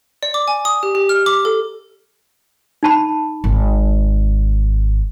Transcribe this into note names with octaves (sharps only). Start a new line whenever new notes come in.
D5
D6
G#5
D#6
G4
G4
F6
D6
A4
D#4 A5 B5
G#1